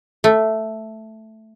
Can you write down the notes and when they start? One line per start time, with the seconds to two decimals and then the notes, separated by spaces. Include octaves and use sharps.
0.24 A3